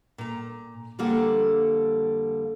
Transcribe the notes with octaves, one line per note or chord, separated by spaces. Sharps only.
A#2 A#5
F2 D3 G3 A#3 A4 F#5